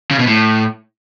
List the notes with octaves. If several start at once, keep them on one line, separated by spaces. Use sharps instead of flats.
C#3
B2
A2